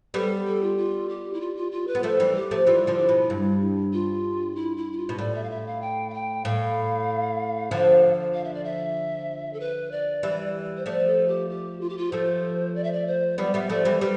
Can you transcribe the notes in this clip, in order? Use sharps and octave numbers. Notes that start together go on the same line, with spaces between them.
G3 B3 A4
A4
F4
F4
G4
E4
F4
F4
F4
B4
B3
F3 A3 A4
E3 G3
G4
F3 A3
E3 G3 F4
D3 F3
E4
B2
G2
F4
E4
E4
E4
F4
B2
A2 D5
E5
F5
E5
F5
G5
F5
G5
A2 F5
D3 F3
F5
E5
D5
E5
A4
B4
D5
E3 G3
C5
F3 A3 D5
A4
G4
G4
F4
G4
F4
F3 A3 C5
D5
E5
D5
C5
G3 B3 D5
G3 B3 E5
F3 A3 D5
E3 G3 C5
G3 B4